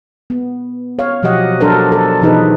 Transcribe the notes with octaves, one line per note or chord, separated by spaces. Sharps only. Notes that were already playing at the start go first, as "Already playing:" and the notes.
B3
C#5 F5
B2 F3 F#3 G4 D#5 F#5
F#3 D4 A4 A#4 C5
A4
B2 E3 F3 D#4 G#4 B4